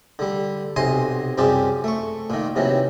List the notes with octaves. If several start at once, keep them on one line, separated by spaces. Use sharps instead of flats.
D3 G3
B1 C3 D#5 G#5 C6 D#6
C2 F#2 C4 G4 G#4 D5
A3 C#6
A#2 D#3
C3 D#3 E3 F#3